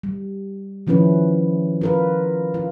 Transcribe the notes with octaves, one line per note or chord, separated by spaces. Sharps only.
G3
D#3 F3 C#4 E4 B4
F4 A#4 B4
F4